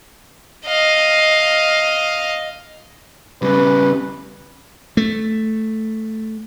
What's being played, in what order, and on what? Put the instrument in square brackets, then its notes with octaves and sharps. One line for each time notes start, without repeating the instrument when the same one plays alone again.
[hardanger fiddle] D#5 F5
[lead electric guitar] C#3 G3 [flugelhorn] B4
[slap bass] A3